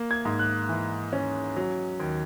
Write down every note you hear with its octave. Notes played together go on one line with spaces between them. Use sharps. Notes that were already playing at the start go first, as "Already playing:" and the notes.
Already playing: A#3
G#6
G#2
F#6
E3
C#4
F#3
D#2